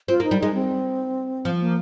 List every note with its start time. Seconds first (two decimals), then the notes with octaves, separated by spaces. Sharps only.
0.08 C4 F4
0.20 A#3
0.24 D#4
0.31 G3
0.39 G#3 D#4
0.54 C4
1.45 F3
1.61 A#3